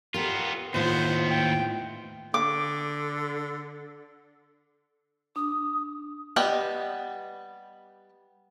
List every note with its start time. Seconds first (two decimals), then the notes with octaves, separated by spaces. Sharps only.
0.14 B3 F4 G4 A#4
0.74 D#2 A2 B3 F4 C5
1.30 G5
2.34 D3 D6
5.36 D4 D#6
6.36 G3 B3 B4 D#5 G5